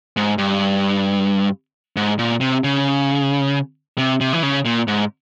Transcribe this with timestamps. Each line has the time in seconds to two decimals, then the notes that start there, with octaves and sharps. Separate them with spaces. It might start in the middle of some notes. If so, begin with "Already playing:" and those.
0.17 G#2
0.38 G2
1.96 G#2
2.19 A#2
2.41 C3
2.64 C#3
3.98 C3
4.21 C3
4.33 E3
4.43 C#3
4.65 A#2
4.88 G#2